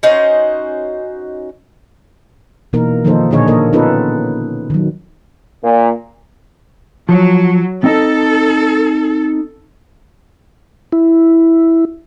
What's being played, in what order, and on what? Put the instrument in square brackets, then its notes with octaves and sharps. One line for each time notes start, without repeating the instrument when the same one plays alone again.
[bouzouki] C#4 D#4 F#4 C5
[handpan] B2 E3 A#3 D#4 A#4
D#3 F3 A#3 D#4 A4 C5
A#2 D3 D4 G#4 C#5 D#5
A#3 A4 A#4 C#5 D#5
B3 C#4 D#4 F4 A4 B4
D#3 F#3
[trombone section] A#2
[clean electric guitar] F3 [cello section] F#3
[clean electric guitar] C4 D#4 D#5 [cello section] A4
[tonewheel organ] E4